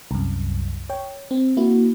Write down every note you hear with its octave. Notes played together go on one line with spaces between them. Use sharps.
C2 F#2
C#5 G5
C4
A#3 E4 F#4